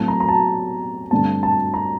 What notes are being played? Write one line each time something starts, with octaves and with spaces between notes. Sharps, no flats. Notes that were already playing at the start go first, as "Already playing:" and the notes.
Already playing: A2 F#3 A3 C4 A5
A#5
A#5
A5
G2 D3 A3 C4 A5
A5
A#5